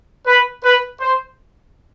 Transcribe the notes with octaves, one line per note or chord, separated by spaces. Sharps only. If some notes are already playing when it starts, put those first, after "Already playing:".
B4
B4
C5